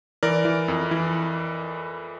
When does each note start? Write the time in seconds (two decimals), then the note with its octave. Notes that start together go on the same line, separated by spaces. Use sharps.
0.23 E3 A#4 D5
0.45 E3
0.68 F2
0.91 E3